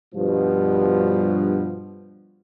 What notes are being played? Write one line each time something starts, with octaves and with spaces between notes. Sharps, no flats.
G2 B2 F3